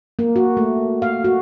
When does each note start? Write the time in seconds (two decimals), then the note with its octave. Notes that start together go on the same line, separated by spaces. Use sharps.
0.19 A#3
0.36 F#4
0.57 A3
1.02 F5
1.24 F#4